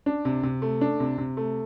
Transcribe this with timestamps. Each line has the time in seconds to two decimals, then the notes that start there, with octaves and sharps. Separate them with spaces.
0.06 D4
0.25 C3
0.43 C3
0.62 A3
0.81 D4
1.00 C3
1.18 C3
1.37 A3